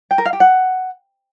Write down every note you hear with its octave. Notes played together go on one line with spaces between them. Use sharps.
G5
A#4
F5
G4
F#5